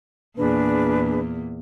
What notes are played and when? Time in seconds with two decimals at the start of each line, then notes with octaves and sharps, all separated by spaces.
0.37 E2 A#2 D4 G#4 B4